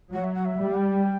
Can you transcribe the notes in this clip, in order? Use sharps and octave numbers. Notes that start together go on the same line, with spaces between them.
F#3 F#5
E5
F#5
E5
G3
G5